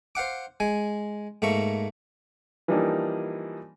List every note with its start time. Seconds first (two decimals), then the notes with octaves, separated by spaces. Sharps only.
0.15 C5 F5 F#5 D6
0.60 G#3 G#5
1.42 G#2 A3 A#3 C#6
2.68 E3 F3 G3 A#3 D4 D#4